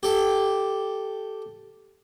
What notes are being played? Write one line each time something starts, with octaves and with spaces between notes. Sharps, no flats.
G4 A4